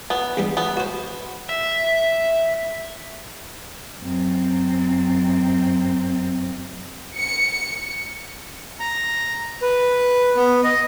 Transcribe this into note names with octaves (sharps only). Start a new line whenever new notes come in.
B3
E2 G2 G3
B3
F#4 C5
E5
F#2 C4
C#7
A#5
B4
B3
D#5